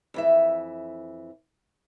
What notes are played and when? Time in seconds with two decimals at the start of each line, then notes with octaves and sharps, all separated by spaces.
0.14 F2 E3 E5